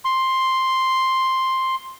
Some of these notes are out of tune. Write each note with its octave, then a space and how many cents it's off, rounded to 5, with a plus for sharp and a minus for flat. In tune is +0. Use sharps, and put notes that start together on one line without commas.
C6 +5